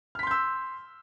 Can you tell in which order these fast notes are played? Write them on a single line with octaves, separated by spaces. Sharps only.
F6 B6 C6 G6 E6